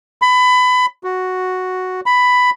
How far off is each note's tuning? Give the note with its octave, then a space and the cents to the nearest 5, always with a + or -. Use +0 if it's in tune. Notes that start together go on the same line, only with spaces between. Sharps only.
B5 +25
F#4 +0
B5 +10